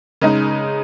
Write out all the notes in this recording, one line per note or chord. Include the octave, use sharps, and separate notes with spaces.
C#3 G#3 D#4